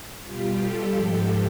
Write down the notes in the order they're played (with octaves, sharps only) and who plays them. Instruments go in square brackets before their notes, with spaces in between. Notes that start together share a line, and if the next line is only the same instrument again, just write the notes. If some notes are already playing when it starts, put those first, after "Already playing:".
[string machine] B2 G3 F4 G4
G4 A4
G#2 F3 G#3 G4 A4